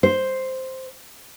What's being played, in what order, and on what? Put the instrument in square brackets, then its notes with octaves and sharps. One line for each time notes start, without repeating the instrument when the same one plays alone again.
[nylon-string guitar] C5